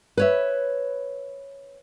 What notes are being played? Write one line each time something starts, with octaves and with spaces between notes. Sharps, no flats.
B4 C#5 E5